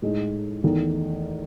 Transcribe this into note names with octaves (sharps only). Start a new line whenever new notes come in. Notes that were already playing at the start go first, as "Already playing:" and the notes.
A2 G#3 D#4
E2 D#3 A3 D#4